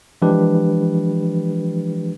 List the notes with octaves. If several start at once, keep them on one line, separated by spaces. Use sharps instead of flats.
E3 F3 G#3 D4 G4 B4